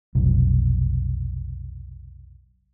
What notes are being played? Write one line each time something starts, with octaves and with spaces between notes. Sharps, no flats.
F1 B1